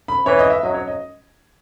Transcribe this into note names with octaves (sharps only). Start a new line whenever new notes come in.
B5
E3 C#5
D#5
E5
F#3 D#5
C#5
D#5